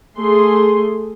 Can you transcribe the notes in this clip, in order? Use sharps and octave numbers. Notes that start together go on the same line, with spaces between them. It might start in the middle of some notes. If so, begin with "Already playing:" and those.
A3 G#4 C6